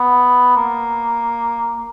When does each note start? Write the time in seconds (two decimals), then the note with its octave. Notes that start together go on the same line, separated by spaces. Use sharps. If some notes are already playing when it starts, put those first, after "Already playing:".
Already playing: B3
0.56 A#3